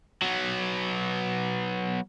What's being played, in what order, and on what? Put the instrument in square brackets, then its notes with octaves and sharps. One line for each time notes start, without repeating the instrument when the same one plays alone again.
[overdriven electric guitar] F#3 B3